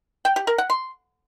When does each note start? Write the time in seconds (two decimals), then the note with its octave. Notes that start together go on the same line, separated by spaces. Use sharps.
0.25 G5
0.36 G4
0.47 A#4
0.58 F#5
0.70 C6